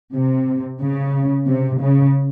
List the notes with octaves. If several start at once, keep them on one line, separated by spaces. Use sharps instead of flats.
C3
C#3
C3
C#3